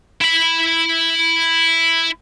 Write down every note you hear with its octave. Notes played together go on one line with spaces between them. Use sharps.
E4 B5